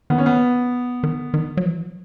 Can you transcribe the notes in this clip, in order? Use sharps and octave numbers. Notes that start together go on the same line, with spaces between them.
D#3 B3
C#4
B3
D#3
D#3
F#3
E3